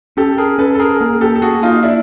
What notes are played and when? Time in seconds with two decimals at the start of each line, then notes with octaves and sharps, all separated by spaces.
0.17 C#4 G4 A4
0.38 G#4 A#4
0.58 C#4 A4 B4
0.75 A4
0.79 G#4 A#4
1.00 A#3 G#4 A#4
1.21 G4 A4
1.36 A4
1.42 A#3 F#4 G#4
1.63 D#4 F4
1.83 D4 E4